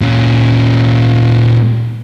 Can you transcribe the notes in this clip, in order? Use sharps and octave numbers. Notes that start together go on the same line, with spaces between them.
A#2 C#4